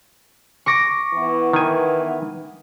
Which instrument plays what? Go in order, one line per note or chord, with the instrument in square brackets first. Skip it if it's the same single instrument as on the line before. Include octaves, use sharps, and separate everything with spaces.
[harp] C#6 D6 A#6
[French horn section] E3 B3
[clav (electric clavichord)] D#3 G#5